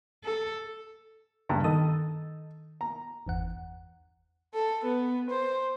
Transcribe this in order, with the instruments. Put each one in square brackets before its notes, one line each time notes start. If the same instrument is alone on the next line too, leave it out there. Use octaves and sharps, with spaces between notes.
[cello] A4
[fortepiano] C#2 G2 A#5
[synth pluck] D#3 D#6 [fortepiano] D#4 A4
[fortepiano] A#5
[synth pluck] G1 E2 F#5
[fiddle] A4
B3
C5